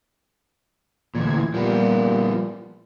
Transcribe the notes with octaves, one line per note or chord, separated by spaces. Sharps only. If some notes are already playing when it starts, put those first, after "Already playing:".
D2 A#2 E3 G#6
A#2 F3 G3 B3